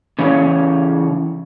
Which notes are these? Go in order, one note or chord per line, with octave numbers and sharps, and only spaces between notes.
C#3 E3 C#4 C#5 F5